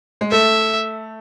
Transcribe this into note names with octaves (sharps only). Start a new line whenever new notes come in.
G#3
A3 E5